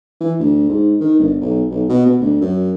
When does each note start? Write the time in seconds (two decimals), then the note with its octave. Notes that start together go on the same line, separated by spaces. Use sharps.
0.21 E3
0.39 D2
0.69 G#2
1.01 D#3
1.20 G1
1.41 B1
1.71 B1
1.89 B2
2.06 B2
2.21 D2
2.41 F#2